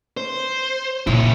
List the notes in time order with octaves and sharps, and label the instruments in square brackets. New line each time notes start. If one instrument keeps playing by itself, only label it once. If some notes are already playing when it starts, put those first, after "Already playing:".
[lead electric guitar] C5
[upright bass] A#2 [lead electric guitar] C#3 E4